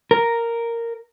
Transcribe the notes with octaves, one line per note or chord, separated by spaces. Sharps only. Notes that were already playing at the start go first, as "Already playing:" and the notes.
A#4